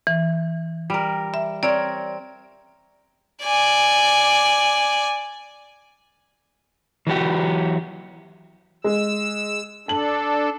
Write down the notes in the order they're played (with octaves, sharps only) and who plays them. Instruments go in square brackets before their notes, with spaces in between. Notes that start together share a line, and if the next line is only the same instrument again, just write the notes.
[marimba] E3
[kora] G3 A#4
[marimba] E5
[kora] C4 A#4 C#5 [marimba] D5
[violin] D5 G#5
[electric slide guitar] E3 F#3 F#4 G4
[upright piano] G#3 [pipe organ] E6
[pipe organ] D4 A4 [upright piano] A5 F#7